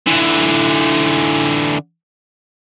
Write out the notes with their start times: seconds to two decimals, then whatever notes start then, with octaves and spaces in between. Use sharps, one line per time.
0.07 D3 E3